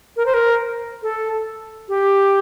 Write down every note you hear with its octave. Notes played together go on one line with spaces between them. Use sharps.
A#4
C5
A#4
A4
G4